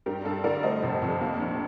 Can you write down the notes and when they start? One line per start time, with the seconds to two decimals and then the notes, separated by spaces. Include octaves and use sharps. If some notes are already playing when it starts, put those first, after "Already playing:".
0.06 G2 G4 A#4
0.25 G2 A4
0.44 D3 A#4 D5
0.63 A3 C5 D#5
0.83 F1
1.02 F2
1.21 A#3
1.40 A#1